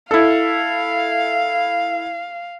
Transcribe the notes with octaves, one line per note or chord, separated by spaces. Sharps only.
E4 A4 F5